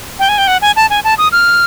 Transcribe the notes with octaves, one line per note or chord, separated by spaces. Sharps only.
G5
G#5
G5
F#5
G#5
A5
G#5
A5
D#6
F6